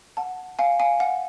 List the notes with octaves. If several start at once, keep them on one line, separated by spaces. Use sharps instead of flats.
F#5 A5
F5 G#5
F5 G#5
F#5